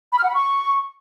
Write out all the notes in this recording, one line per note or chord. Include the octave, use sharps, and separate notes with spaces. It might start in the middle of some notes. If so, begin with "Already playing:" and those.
B5
F6
F#5
B5
C#6